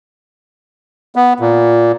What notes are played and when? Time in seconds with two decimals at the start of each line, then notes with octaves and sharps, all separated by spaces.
1.16 B3
1.40 A#2